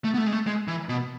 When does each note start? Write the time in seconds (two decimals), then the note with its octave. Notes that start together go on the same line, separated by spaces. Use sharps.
0.04 A3
0.14 B3
0.18 A3
0.26 G#3
0.33 A3
0.47 G#3
0.68 E3
0.89 B2